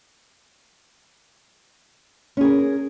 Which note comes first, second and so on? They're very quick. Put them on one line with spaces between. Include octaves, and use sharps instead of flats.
C#4 G#4 A#4